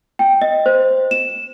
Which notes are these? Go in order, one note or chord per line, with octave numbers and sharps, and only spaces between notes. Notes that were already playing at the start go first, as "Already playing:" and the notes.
G5
D#5
C5
E7